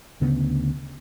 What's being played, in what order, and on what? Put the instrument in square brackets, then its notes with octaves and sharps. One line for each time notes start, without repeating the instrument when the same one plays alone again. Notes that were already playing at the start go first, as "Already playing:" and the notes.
[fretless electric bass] D2 C#3 B3